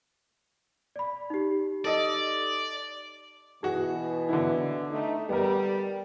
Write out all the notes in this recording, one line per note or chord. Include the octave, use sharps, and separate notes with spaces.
D5 B5
D#4 G4
A4 D5 D#5
B2 E3 F#4 G#4
D3 B3 E4
A3 D#4
G3 B3 A#4